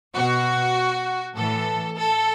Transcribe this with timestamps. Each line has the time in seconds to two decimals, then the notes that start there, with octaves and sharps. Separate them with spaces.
0.16 B2 F#4
1.37 A2 E3 A4
1.98 A4